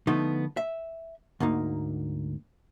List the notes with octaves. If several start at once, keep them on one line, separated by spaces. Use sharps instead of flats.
D3 F3 A3 B3 D#4
E5
D2 G#2 A#3 D#4